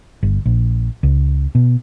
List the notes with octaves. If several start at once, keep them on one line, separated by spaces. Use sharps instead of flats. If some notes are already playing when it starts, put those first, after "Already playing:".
G1
A#1
C#2
B2